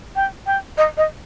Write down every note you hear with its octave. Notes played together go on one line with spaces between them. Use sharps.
G5
G5
D#5
D#5